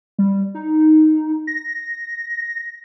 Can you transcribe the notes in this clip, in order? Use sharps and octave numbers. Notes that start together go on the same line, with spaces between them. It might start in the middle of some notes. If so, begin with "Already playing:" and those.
G3
D#4
A#6